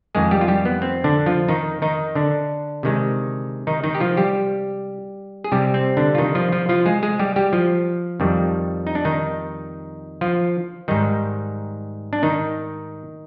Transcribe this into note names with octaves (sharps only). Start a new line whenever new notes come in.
F2 D#3 G#3 G#4
G3 G4
F4
G3 G4
B3
C4
D3 D4
F3 F4
D#3 D#4
D#3 D#4
D3 D4
C3 D#3 G#3
D#3 D#4
D#3 D#4
G4
F3 F4
G3 G4
G#4
C3 G3 G4
C4
D3 D4
F4
D#3 D#4
F3 F4
F3 F4
F3 F4
G#3 G#4
G#3 G#4
G3 G4
G3 G4
F3 F4
F2 D#3 G3
D#4
D4
D#3 D#4
F3 F4
G#2 D#3 G3 D#4
D4
D#3 D#4